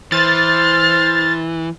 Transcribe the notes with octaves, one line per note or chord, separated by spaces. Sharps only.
E3 C5 F6 A6